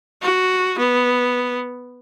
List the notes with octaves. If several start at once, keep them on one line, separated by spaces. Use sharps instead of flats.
F#4
B3